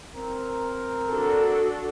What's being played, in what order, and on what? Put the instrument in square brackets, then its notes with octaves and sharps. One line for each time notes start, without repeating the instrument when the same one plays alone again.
[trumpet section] C4 A#4
[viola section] D4 F#4 A4